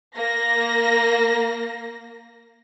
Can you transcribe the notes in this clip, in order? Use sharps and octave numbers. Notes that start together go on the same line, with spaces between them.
A#3 A#6